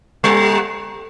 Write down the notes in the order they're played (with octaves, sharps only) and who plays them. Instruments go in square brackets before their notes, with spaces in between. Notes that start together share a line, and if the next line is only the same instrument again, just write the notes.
[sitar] G3